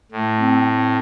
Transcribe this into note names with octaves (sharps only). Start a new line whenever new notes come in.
A2 A3
C4
C4